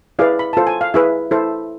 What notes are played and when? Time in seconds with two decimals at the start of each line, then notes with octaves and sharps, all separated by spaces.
0.19 E4 G#4 B4 D5 F5
0.39 B5
0.53 F4 A4 C5 A5
0.67 G#5
0.81 F5
0.94 E4 G#4 B4 E5
1.31 E4 A4 C5